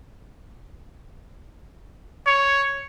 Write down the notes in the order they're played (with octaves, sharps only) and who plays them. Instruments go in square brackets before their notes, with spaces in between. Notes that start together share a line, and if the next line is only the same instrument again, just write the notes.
[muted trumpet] C#5